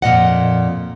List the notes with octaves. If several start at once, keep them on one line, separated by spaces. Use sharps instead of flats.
F2 A#2 D#5 F#5